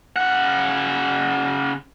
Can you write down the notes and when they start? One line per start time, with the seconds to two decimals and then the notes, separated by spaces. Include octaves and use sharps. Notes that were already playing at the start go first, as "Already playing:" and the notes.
0.16 C#3 F#5